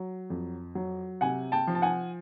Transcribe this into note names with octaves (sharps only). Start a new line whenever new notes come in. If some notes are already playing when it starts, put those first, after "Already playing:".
Already playing: F#3
F2
F#3
C3 F#5 G#5
G5 A5
F3
A5
F#5 G#5